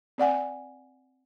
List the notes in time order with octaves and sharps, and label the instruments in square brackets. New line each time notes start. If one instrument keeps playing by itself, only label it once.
[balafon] C4 D5 F#5 G#5